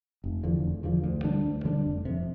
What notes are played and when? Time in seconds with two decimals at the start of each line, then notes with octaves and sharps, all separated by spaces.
0.24 F1
0.43 E2 D3 F3
0.64 F1
0.83 E2 D3 F3
1.03 D2
1.24 D3 G3 D4
1.44 D2
1.65 D3 G3 D4
1.84 F1
2.05 F2 C3